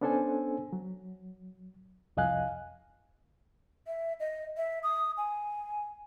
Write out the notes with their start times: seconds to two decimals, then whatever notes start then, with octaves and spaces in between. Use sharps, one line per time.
0.01 B3 C#4 D4 A4 C5 G#5
0.73 F#3
2.17 C2 F2 D#5 F5 G#5 F#6
3.87 E5
4.20 D#5
4.57 E5
4.83 D#6
5.17 G#5